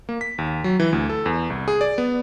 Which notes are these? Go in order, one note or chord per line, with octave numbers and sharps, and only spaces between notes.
A#3
B6
D#2
F#3
E3
D2
A4
E2
C2
G#4
D5
B3